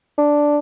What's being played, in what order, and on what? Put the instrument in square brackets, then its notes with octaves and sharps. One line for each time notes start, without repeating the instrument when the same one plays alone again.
[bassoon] D4